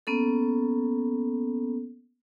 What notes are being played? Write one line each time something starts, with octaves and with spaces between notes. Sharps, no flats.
A#3 B3 C#4 A4